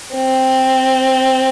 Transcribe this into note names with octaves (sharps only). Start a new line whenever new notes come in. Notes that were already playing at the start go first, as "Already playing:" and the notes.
C4